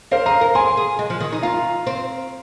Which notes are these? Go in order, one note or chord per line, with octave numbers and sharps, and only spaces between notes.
A#4 C5 F5
G#4 F5 A#5
A#4
G#4 G#5 C6
G#4
G#3
F3
D#3
D#4
F4 F5 A#5
C4